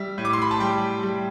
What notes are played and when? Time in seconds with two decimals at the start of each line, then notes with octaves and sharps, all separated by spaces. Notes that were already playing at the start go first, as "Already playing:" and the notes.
Already playing: G3 E5
0.18 A2
0.25 D6
0.33 C6
0.42 B5
0.51 A5
0.60 G3 G5
1.03 G3